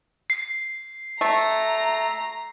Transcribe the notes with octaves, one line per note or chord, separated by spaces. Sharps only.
C7
A3 A#5